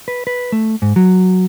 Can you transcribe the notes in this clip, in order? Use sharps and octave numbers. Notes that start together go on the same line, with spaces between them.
B4
B4
A3
G#2
F#3